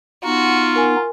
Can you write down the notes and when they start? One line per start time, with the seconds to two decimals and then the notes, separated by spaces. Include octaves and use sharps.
0.24 B3 D#4 F4 F#4
0.76 A#4 G#5